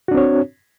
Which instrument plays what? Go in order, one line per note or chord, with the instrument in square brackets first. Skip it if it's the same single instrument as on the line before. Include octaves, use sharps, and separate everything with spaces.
[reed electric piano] F#4
D4
C4
C#5